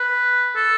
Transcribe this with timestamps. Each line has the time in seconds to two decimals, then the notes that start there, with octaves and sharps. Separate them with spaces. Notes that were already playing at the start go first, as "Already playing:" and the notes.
Already playing: B4
0.56 A4